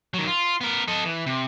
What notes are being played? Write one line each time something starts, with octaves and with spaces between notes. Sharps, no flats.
D#3 F#3
F4
B3 A#4
A4 D#5
E3
C3